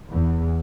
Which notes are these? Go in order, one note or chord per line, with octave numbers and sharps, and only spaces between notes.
E2